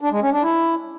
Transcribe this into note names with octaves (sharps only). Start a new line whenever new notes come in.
D4
G#3
C#4
D4
E4